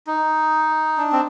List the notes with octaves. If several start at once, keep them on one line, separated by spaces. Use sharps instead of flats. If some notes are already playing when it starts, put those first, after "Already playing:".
D#4
D4
C4